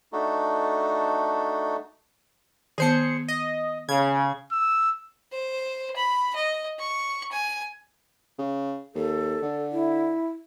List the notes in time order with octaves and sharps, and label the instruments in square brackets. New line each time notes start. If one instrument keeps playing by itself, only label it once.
[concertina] A3 D4 D#4 F#4 A4
[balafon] D#3 B3 [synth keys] G#4 C5 C#7
[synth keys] D#5
[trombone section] C#3 [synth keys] G#6
[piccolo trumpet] E6
[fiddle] C5
B5
D#5
C#6
G#5
[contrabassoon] C#3
[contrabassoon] D#2 [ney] A4
[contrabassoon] D3
[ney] E4